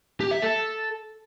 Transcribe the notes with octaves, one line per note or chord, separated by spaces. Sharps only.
G4
E5
A4